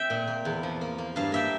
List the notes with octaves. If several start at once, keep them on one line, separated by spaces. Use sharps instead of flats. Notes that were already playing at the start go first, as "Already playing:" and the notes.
Already playing: C4 E5 G5
A#2
A#3
E2
F3
A#3
A#3
G2 F5 A5
A#3 E5 G5